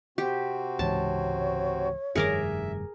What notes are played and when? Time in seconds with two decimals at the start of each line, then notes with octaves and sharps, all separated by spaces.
0.18 C3 C4 F#4 G4
0.79 C#2 G#2 E3 C#5 A5
2.15 F1 G2 D#3 G#4 A#4 E5 D6